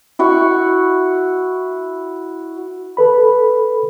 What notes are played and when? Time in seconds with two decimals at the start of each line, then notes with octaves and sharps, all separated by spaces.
0.19 E4 F#4 C#6
2.97 A4 B4 B5